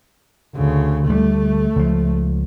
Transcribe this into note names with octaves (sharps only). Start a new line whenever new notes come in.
D2 C#3
D2 F#3 G3 A3
C#2 F3